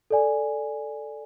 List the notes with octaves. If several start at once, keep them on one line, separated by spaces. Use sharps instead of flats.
A4 D5 G#5